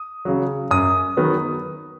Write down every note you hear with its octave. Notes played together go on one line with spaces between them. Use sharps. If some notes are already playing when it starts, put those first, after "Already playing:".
Already playing: D#6
C#3 F#3
F#2 D#6
D#3 F#3 B3